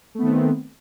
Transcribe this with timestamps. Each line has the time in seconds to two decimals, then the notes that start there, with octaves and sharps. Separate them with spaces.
0.15 A3
0.19 B3
0.23 D#3
0.26 C4